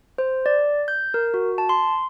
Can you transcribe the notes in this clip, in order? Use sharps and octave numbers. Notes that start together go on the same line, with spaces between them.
C5
D5
G6
A#4
F#4
A5
C6